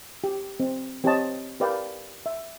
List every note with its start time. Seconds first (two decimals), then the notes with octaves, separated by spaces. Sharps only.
0.24 G4
0.60 C4
1.04 C4 G4 C5 C#5 D#5 A5
1.60 G4 A#4 B4 D5 F5 G5
2.26 E5